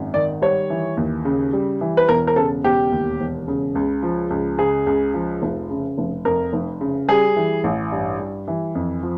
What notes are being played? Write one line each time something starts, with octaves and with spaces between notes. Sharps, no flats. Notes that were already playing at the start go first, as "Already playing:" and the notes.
Already playing: G#1 F#2
D#3 D5
G3 C#5
E3
D#2
C#3
G3
E3
B4
E1 A#4
A#4
C#3 A4
E1 G4
D#2
E1
C#3
C#2
F3
C#2
C#3 G#4
C#2
F3
F1
C#3
F1
F2 A#4
F1
C#3
G3 G#4
E3
A1
G2
G3
E3
F2
F3